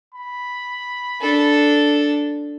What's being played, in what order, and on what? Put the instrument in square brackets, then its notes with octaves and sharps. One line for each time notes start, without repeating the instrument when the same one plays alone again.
[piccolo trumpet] B5
[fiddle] D4 A4